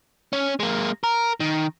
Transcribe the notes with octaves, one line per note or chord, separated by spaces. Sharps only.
C#4
G#3 A#3
A#4
D#3